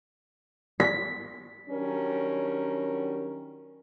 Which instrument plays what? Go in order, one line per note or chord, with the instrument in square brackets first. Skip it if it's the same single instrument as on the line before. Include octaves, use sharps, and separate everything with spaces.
[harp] B6
[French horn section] D#3 F#3 G3 C#4 D4 A#4